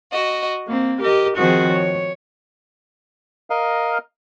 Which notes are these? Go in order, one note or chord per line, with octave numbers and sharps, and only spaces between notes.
F#4 D#5
A#3 C4
G4 A#4 D#5
D#3 F3 C4 F#4 G#4
C#5
A#4 D#5 F5